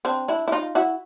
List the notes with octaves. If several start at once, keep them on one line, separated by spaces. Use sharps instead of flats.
C4 D4
D4 E4
E4
D#4 F4
E4 F#4